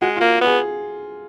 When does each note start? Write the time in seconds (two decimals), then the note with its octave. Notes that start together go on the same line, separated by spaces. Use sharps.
0.02 G#3 F#4
0.16 F4
0.21 A#3
0.41 B3 G#4